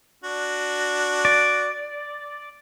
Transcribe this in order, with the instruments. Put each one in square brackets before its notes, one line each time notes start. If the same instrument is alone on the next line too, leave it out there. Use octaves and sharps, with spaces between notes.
[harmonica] D4 F#4
[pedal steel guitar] D5